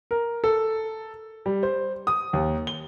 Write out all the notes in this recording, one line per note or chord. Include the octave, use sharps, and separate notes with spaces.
A#4
A4
G3
C5
D#6
D#2
G7